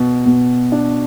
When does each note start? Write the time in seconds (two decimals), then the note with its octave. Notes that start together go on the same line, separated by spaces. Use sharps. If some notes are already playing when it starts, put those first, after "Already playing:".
Already playing: B2
0.26 B2
0.72 D4